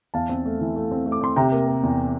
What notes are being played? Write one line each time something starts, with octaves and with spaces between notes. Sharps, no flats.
E2 F5 A5
C4
A3
E3
A3
C4
A3
D6
C4 C6
C3 G5 A#5
A#3
A#3
E2